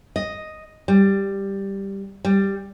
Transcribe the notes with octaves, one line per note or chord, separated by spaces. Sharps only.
D#5
G3
G3